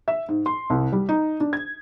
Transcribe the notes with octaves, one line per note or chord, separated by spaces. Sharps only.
E5
G#2
C6
C2
G3
D#4
D4
G#6